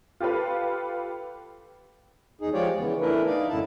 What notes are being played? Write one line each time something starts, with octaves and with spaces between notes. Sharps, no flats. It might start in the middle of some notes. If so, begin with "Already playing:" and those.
F4 G4 A4 B4 F5
E2 D#4 G#4
F3 G#3 F4 G4 C#5 D5
C#3 E3 B3
E3 A3 D4 E4 A#4 B4
D#4 D5 F5
F#2 A2 D3 E4 A5